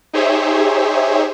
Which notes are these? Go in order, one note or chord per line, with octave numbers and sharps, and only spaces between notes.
D#4 G4 G#4 C5 C#5 E5